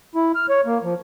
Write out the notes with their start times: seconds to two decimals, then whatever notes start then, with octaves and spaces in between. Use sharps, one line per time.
0.15 E4
0.35 F6
0.49 C#5
0.66 A#3
0.83 F3